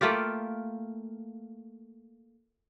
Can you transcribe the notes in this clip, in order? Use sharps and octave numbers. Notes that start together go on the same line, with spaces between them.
A3 A#3 F4 G4